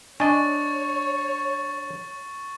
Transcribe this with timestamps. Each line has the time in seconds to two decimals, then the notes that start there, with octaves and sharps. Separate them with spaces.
0.20 D4 C#5 D#5 G#5 C#6 A6